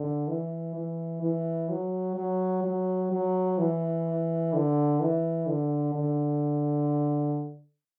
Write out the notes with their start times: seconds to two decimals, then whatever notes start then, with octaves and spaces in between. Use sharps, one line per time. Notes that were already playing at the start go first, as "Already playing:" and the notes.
Already playing: D3
0.28 E3
0.75 E3
1.22 E3
1.69 F#3
2.16 F#3
2.64 F#3
3.11 F#3
3.58 E3
4.53 D3
5.00 E3
5.46 D3
5.94 D3